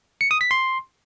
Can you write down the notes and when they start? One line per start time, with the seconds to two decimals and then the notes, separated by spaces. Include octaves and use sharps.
0.21 C#7
0.31 D#6
0.41 B6
0.51 C6